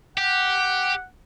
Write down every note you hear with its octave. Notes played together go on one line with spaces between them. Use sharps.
G4 F#5